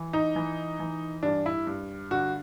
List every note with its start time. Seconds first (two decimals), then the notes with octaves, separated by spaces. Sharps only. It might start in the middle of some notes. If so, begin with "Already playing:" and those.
Already playing: E3
0.13 D#4
0.36 E3
0.80 E3
1.23 G2 D4
1.46 E4
1.67 G2
2.11 D3 F#4